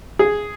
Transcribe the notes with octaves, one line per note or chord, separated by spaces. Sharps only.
G#4